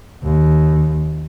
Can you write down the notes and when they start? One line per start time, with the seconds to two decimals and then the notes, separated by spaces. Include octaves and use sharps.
0.23 D#2